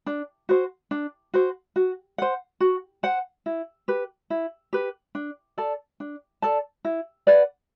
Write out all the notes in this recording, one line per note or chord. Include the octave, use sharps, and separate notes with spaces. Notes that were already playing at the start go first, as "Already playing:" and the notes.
D4
F#4 C5
D4
F#4 C5
F#4
C5 F#5
F#4
C5 F#5
E4
G4 B4
E4
G4 B4
D4
A4 D5 A5
D4
A4 D5 A5
E4
B4 D5 F#5